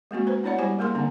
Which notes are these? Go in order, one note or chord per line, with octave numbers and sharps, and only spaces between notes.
G#3 A#3 C4 F#4
B4 C5
B3 D4 E4 C#5 D5 F#5
G3 E4 G4 C5 G#5
A3 A#3 G#4 A#4 C6
D3 A#3 C4 D4